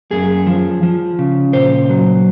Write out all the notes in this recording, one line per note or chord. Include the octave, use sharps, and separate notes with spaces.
F#2 G#4
F3
F3
C#3
A#2 C5
F#3